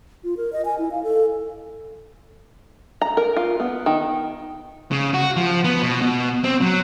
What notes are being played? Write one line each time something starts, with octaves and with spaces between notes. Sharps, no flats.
F4
A#4
D#5
G#5
E4
F5
A4
A#5
A#4
F4
B3
D#3
C#3
F#4
F3
B3
B2
B2
C4
F#3